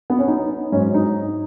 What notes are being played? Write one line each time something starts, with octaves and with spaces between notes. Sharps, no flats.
B3
C#4
D#4
G#2 F#3 C#4
D#4